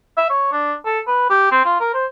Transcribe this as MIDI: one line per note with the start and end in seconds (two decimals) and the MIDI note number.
0.17 0.29 76
0.30 0.52 73
0.52 0.73 62
0.86 1.00 69
1.07 1.26 71
1.30 1.47 67
1.52 1.62 60
1.65 1.77 65
1.80 1.92 70
1.94 2.06 72